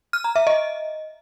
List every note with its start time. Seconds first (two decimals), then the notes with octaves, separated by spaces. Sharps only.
0.13 F6
0.24 A#5
0.36 E5
0.47 D#5